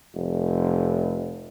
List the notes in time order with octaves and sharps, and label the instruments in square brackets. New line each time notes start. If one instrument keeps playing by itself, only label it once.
[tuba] F1